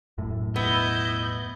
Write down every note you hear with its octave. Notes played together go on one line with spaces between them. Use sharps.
E1 F#2 A2
B3 E4 D#5 G6